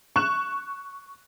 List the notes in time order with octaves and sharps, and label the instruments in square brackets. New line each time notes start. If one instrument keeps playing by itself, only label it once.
[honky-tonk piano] C#6 F#6 E7